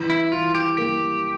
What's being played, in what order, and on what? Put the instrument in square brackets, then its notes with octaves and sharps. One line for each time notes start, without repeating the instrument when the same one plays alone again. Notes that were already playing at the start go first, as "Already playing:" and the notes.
Already playing: [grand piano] E3
[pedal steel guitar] E4
[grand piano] E3 [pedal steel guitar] F4
[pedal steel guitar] G4
[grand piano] A#3 [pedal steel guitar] G4